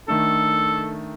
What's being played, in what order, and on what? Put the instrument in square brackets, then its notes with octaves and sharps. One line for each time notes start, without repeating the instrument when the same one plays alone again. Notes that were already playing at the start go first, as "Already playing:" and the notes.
[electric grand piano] D#3 A3 D4 [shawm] A4